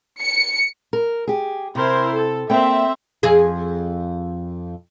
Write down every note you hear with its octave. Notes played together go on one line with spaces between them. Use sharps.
C#7
A#4
G4 G#4
C3 E4 A#4 C5
A4
A#3 C4 D5 E5 G5
F2 G#4